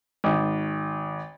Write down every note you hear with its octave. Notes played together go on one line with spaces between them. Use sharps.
G#1